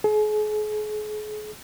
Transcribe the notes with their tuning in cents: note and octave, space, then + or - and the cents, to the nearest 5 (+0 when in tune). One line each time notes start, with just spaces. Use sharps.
G#4 +40